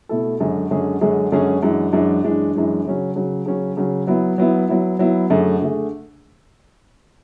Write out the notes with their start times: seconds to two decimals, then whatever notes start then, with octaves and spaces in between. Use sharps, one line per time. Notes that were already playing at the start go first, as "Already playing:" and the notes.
0.09 B2 A3 E4 A4
0.40 F#2 D3 G#3 C#4 G#4
0.71 F#2 D3 G#3 C#4 G#4
1.01 F#2 D3 G#3 C#4 G#4
1.32 F#2 D3 G#3 C#4 G#4
1.63 F#2 E3 G#3 D4
1.93 F#2 E3 G#3 D4
2.24 F#2 E3 G#3 D4
2.54 F#2 E3 G#3 D4
2.85 C#3 F#3 C#4
3.16 C#3 F#3 C#4
3.46 C#3 F#3 C#4
3.77 C#3 F#3 C#4
4.07 F#3 B3 E4
4.38 F#3 B3 E4
4.69 F#3 B3 E4
4.99 F#3 B3 E4
5.30 F#2 D3 A3 D4 G#4
5.62 D3 A3 D4 G#4